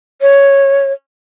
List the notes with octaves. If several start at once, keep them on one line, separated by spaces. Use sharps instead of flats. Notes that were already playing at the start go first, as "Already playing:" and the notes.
C#5